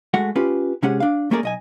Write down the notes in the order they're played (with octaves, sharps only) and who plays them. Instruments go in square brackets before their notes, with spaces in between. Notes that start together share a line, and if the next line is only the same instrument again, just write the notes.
[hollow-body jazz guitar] G#3 A3 F#4 F#5
C#4 F4 G4 B4
C3 G#3 C#4 G4 G#4 F#5
D4 F5
A3 A#3 C#4 G#4 A#4 D5
B1 D#5 G#5